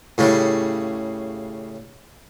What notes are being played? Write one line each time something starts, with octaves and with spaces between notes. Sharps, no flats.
A2 C#3 G3